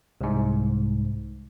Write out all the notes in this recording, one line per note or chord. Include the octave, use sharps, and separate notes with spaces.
C2 G#2